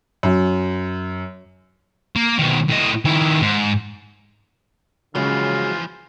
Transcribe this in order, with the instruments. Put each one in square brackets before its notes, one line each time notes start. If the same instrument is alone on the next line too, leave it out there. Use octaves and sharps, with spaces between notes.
[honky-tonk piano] F#2
[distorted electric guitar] A#3
B2 D#3
A2 D#5
D#3 E4
G#2
[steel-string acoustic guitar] F#2 G#3 F#4 [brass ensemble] C#3 [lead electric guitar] E3 F3 [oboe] F4